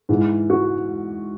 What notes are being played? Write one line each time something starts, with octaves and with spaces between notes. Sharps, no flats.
G#2 E3
F#4